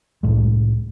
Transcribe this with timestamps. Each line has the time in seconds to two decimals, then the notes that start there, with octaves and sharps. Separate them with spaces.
0.23 C2 A2 G#3